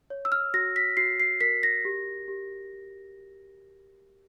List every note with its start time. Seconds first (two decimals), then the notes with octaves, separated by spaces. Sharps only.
0.10 C#5
0.25 E6
0.32 F6
0.54 F#4 A#6
0.76 B6
0.97 F#4 C7
1.20 C7
1.41 A#4 B6
1.63 A#6
1.85 G4
2.28 G4